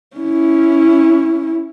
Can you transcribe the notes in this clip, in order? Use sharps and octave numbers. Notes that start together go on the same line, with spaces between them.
C#4 E4